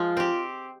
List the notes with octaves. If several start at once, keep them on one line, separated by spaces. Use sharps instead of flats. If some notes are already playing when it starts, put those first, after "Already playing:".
Already playing: F3 G#3 F4
C4 G4